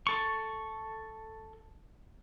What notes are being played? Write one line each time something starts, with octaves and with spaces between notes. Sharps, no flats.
A4 C#6